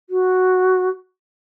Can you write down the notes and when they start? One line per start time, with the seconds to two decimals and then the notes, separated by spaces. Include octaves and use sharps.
0.10 F#4